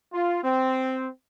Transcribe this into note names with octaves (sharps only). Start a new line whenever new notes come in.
F4
C4